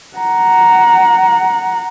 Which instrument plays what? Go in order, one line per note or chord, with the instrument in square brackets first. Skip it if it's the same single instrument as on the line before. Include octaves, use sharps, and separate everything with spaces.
[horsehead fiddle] F#5 A#5